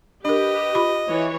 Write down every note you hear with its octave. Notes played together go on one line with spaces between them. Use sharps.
D4 G4 A#4 B4 D#5
F4 B5
E3 C#5